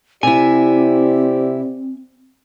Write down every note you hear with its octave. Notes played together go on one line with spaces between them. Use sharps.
C3 C4 E4 G4 C5 D5 G#5